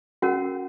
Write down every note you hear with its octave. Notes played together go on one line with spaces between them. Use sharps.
C#4 F#4 A#4 F#5